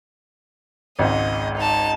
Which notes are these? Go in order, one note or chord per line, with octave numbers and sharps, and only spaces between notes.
G#1 C#2 G#2 D#5
D#4 A5